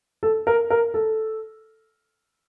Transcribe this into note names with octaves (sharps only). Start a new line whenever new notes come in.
A4
A#4
A#4
A4